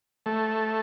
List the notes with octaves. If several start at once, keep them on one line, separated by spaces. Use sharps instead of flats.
A3